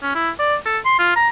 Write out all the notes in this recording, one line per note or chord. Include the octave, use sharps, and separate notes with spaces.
C#4
E4
D5
A4
C6
F4
A#5